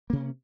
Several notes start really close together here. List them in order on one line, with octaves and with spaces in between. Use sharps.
A#3 C3 C#4